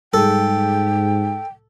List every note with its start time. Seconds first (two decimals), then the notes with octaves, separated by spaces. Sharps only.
0.14 G#2 G3 G#4 A4 G5